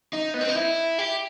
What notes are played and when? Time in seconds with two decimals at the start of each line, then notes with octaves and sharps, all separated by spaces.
0.13 D#4
0.34 B3
0.41 C4
0.49 D#4
0.56 E4
0.99 G4